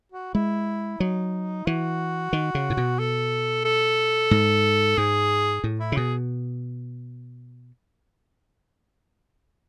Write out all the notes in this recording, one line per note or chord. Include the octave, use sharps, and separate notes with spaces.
F#4
G#3 E4
F#3 D#4
E3 F#4
D#3
C#3
A2
B2
A4
A4
G#2
G#2 G#4
A2
E4
C#3
B2 G#4